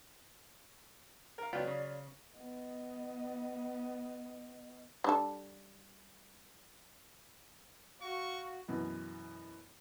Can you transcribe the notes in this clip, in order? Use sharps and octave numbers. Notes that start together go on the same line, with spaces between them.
A#4 F5
C#2 F#3 B3 F4 D5 G5
C#3
B3 D#5
G3 D4 A4
F#4 F5 C#6
F#2 B2 E3